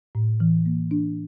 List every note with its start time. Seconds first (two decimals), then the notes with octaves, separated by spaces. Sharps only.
0.15 A2
0.40 E3
0.66 A#3
0.91 D4